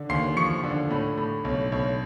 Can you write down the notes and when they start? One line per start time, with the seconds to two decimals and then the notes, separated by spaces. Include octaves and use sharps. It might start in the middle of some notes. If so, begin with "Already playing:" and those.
Already playing: D3
0.09 D#2 C6 C7
0.37 F3 C#6 C#7
0.63 D3
0.90 A2
1.17 A2
1.44 B1
1.72 B1